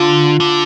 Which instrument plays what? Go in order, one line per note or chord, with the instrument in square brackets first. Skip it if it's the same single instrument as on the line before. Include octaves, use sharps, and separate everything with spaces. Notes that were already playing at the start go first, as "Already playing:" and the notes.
Already playing: [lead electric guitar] D3 [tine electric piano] F4
[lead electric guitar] D3